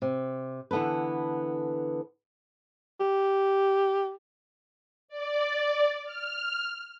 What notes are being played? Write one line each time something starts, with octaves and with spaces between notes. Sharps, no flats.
C3
D3 E3 B3 A4 B4
G4
D5
F6